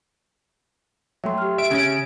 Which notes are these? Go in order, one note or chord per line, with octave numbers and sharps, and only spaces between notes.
F#3 A3 E5 G5 C6
G4 F6
E5 D7
C#3 C#4